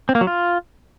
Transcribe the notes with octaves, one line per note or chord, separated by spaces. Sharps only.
C4
A#3
F#3
F4